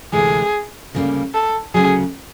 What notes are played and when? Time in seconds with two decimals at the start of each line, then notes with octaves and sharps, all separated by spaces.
0.12 D2 C3 E3 G#3 G#4
0.93 D2 C#3 E3 G3 A#3
1.34 A4
1.74 D2 C#3 F#3 G#4